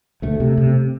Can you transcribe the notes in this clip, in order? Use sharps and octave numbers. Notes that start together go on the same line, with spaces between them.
D2 A3
C3
C3